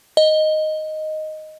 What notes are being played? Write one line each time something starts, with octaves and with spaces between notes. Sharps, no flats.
D#5